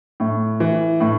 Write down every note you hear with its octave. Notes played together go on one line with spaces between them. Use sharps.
A2
E3
A2